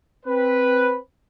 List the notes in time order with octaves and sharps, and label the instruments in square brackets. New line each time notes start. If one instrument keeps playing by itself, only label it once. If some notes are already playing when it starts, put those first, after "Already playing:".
[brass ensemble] C4 B4